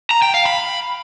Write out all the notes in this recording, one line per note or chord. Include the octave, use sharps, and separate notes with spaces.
A#5
G5
F5
B5